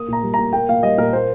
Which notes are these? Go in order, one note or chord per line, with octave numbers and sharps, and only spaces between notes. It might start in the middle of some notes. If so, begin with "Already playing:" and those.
Already playing: A#3 D#6
A#2 A#5
G3
A#5
A#2
A#3 G5
A#2 F5
G3 D#5
A#2 A#4
A#3 C5